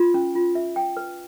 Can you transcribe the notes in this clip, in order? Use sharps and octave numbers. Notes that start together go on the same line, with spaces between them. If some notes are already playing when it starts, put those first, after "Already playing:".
Already playing: F4
C#4
F4
E5
G5
B4